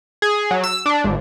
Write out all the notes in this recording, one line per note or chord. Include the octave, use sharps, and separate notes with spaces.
G#4
F#3
E6
D4
G#1